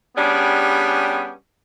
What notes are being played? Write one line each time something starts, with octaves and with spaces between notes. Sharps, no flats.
G3 B3 C#4 D4 G4 G#4